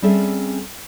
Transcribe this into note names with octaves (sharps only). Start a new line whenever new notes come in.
G3 C4 C#4 G#4 A4 E5